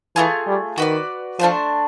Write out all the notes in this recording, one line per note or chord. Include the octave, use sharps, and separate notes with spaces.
E3 A3 C4 F4 G#4
G3
D#3 F#4 B4 D5
F3 A3 D4 G4 C5